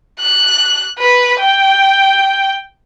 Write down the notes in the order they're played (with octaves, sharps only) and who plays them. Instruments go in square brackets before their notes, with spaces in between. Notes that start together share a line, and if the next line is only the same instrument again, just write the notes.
[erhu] F#6
B4
G5